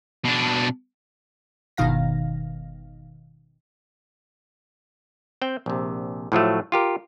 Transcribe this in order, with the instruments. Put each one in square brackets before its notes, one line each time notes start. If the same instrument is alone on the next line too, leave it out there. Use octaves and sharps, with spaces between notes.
[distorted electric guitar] B2 D4
[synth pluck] G1 B2 D#3 F5 A#6
[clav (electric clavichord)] C4 G5
A#1 C3
A2 F3 F#3 A3
F4 G4 A#4